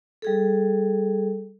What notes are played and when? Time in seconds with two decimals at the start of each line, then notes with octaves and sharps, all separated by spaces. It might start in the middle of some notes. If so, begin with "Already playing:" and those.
0.22 G3 G#4 A4